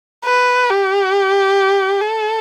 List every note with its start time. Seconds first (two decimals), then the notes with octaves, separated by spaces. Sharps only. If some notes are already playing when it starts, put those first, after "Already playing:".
0.25 B4
0.69 G4
2.01 A4